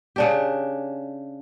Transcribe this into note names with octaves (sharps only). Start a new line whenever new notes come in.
C#3 D4 G4